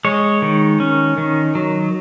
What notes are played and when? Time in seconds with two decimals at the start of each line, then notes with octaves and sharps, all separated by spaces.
0.05 G#3 C#5
0.42 D#3
0.80 C#4
1.18 D#3
1.55 F#3